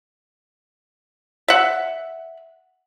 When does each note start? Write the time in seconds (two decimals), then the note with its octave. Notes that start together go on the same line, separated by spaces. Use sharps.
1.48 E5 F#5